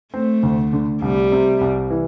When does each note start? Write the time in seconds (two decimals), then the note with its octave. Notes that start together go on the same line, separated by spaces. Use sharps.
0.14 A3 C4
0.43 D2
0.73 D3
1.02 C2 G3
1.32 C3
1.61 C2
1.90 E3